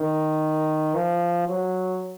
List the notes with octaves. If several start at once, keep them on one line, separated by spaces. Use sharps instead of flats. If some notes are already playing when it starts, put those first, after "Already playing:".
Already playing: D#3
F3
F#3